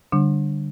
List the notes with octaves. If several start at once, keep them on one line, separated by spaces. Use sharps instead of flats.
D3 G3 D4